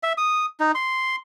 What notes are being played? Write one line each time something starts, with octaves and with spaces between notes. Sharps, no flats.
E5
D#6
D#4
C6